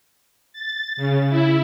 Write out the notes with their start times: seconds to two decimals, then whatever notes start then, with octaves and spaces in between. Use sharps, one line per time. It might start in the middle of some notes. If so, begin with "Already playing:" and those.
0.53 A6
0.97 C#3
1.29 E4